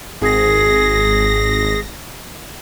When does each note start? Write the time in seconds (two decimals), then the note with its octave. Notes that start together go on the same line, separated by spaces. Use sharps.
0.21 G#1 G#4 A#6